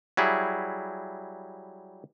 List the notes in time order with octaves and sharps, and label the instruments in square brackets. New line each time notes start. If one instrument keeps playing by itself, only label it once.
[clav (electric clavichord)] F#3 G3 E4 G#4